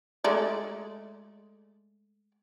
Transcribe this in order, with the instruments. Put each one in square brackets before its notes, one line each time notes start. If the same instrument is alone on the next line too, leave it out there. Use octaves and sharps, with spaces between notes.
[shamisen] G#3 A3 D5